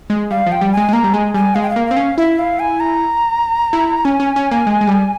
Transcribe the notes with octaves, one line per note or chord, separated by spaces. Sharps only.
G#3
G3 F5
F3
G5
G3
G#3 G#5
G#3
A#3 A#5
G3
G#3 G#5
G3 G#5
G#3 F5
G5
F5
A#3
C4 F5
C#4
E4 E5
F5
G#5
A#5
E4
C#4 G#5
C#4
C#4
A#3
G#3
G#3
G3